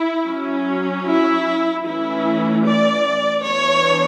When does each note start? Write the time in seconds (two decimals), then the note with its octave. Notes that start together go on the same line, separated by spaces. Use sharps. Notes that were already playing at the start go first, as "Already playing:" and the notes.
Already playing: E4
0.26 F#3 C#4
1.06 E4
1.85 E3 A3 C#4 E4
2.65 D5
3.44 E3 B3 D4 C#5